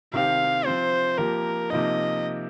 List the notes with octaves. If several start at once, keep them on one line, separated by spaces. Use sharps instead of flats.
C3 D#3 C4 G4 F5
F3 C4 F4 C5
F3 A#3 G4 A#4
C3 F3 A#3 D#4 D#5